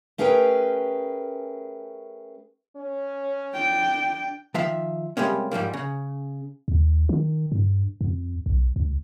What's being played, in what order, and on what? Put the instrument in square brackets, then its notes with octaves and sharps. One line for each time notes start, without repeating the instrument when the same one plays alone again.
[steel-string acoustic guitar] A3 C#4 G#4 A#4 B4 G5
[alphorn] C#4
[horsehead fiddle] D4 G5
[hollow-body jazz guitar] D#3 F3 E5 F5
C3 G3 G#3 A#3 C#4
G#2 F3 G3 A#3
C#3
[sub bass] D#2
D#3
G2
F2
B1
C#2